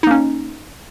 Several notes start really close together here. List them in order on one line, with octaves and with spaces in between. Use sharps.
D#4 A#3 C#4